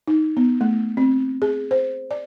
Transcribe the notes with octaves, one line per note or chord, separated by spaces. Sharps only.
D#4
B3
A3
C4
G#4
C5
D5